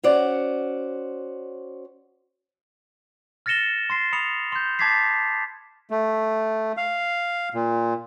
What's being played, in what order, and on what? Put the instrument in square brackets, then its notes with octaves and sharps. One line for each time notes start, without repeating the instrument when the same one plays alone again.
[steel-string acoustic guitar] C#4 F#4 C5 D5
[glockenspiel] F6 A6 A#6 C#7 E7 G7
C6 A6 C7
B5 D#6 C#7 F7
C6 G6
A5 D6 G#6 A6 B6 C7
[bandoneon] A3
F5
A#2